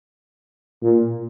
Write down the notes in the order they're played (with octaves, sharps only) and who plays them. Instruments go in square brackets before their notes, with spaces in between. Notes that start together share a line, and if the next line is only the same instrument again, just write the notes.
[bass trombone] A#2